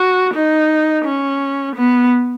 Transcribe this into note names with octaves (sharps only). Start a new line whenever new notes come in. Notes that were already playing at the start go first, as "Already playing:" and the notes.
Already playing: F#4
D#4
C#4
B3